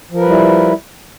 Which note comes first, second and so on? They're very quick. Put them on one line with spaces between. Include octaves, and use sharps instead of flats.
F3 A#4 B4 G3 E4